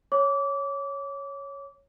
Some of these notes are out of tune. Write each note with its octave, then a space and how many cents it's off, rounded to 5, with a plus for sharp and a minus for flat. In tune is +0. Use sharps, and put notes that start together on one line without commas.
C#5 +0 D6 -25